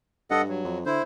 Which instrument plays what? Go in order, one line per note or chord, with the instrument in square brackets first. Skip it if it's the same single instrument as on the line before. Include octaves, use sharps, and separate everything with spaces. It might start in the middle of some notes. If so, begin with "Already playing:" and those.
[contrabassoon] G2 [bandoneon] A4 D#5 F#5
[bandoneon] F#3
[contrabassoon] F2
[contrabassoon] D3 [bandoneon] E4 C5